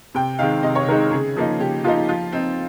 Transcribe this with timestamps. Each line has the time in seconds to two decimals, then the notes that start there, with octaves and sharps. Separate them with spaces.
0.14 C3 G5
0.39 D#3 G#3 C4 D#4 F5
0.63 C3 D#5
0.75 C#5
0.87 D#3 G#3 C4 D#4 A#4
1.11 C#3 G#4
1.36 F3 A#3 D#4
1.59 C#3 G4
1.84 F3 A#3 D#4 F4
2.09 F3 F4
2.32 C4 D#4